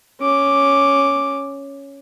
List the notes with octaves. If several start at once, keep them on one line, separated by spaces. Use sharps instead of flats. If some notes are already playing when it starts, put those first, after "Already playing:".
C#4 D6